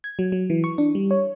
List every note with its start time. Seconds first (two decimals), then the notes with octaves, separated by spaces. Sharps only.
0.04 G#6
0.19 F#3
0.32 F#3
0.50 E3
0.64 C#6
0.78 D4
0.95 G3
1.11 C#5